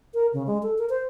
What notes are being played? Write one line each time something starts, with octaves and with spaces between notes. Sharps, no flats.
A#4
C#3
G#3
A4
A#4
C5